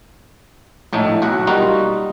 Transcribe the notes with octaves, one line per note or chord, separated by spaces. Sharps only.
A#1 A2 A3 D#4
B1 F#4 F#5
G3 A#3 D#4 F4 F#4